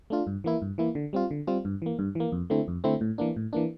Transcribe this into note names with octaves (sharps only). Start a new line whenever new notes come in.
A3 D4 F4
G2
E3 A#3 E4
G2
E3 A#3 E4
D3
G3 C4 F4
D3
G3 C4 F4
G2
E3 A#3
G2
E3 A#3
F2
D3 A3 C4 E4
F2
D3 A3 C4 E4
A2
E3 A#3 D4
A2
E3 A#3 D4